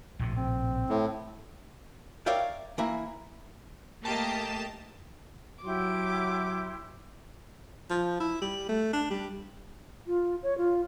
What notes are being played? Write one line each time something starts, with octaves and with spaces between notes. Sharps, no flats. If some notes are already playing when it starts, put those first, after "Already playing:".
A#1 A2 C3
C4
A2
A#4 C#5 D5 E5 F5 G5
E3 A#3 E4
A3 A#3 G4 D#5 G5 A5
F#3 E4 G4 C6 D6
F3
E4
G3
A3
D4
G3
F4
C#5
F4